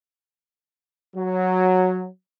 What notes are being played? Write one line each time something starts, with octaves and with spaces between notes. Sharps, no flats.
F#3